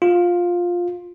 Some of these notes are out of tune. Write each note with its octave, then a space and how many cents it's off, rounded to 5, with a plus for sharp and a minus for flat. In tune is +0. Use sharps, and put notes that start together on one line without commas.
F4 +10